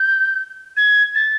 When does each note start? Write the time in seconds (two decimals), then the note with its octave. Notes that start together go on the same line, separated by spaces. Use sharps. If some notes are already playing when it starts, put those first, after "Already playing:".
Already playing: G6
0.77 G#6
1.15 A6